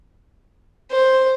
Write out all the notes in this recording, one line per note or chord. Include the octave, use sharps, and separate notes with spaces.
C5